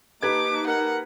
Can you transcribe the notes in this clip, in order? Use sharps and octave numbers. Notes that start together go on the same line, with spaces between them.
A#3 D#4 G4 B4 A5 D6 G#6
A#4 F#5